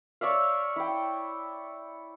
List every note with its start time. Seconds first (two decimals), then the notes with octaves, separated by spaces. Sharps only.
0.21 C#5 D5 E5 F5
0.76 E4 G5